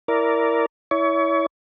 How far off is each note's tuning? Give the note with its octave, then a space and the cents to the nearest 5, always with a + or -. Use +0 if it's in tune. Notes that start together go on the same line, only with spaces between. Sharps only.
E4 +0 A#4 +0 D5 -15
E4 -10 C#5 +30